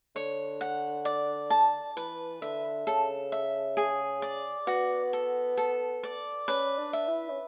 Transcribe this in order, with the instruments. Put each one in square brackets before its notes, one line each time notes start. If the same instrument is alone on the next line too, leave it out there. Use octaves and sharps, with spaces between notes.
[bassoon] D3 [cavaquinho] C#5
[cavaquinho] F#5
D5
A5
[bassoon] E3 [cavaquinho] B4
[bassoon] D3 [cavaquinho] E5
[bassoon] C#3 [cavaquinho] A4
[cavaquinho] E5
G#4
D5
[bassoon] B3 [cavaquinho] F#4
[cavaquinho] A4
A4
D5
[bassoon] C#4 [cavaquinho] B4
[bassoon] D4
[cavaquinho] E5
[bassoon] E4
C#4